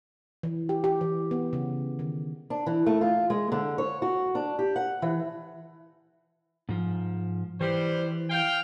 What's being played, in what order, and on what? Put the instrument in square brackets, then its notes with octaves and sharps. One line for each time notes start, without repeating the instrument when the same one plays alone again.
[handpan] E3
G4
G4
E3
B3
C#3
D#3
[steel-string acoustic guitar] D4
E3
A3
F4
G#3
D3
C#5
F#4
D4
G4
F#5
E3
[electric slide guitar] G#2 F3
[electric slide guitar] E3 [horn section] G3 C5
[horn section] F5 G5